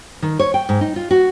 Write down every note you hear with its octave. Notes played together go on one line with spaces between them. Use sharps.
D#3
C#5
G5
G#2
D#4
F4
F#4